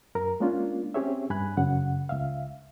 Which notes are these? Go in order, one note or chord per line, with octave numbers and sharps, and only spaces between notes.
F#2 A#4 A#5
G#3 A#3 C#4 D4 F4
C4 C#4 G4 G#4 C#5 E5
G2 G#5 B5 F#6
F#2 C#3 F#5
C#2 E5 F5